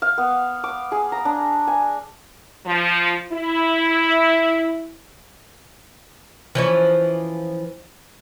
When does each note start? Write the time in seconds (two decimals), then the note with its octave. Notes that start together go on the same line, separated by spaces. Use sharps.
0.02 F5
0.18 B3
0.64 D6
0.92 G#4
1.12 A#5
1.25 D4
1.67 G#5
2.66 F3
3.32 E4
6.55 E3 F3 C#4